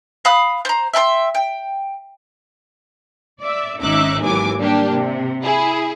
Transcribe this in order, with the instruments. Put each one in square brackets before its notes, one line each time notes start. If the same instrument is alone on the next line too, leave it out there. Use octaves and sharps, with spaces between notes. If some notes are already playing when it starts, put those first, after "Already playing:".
[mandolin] F5 B5 D#6 F#6
C5 A#5
E5 G5 A5 C6
G5
[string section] D5 E5
G#1 C#4 D#4 E5 D6 F#6
G#1 D#2 E3 F#3 G#5 D6
G3 A#3 D4 G4
C3
E4 G#4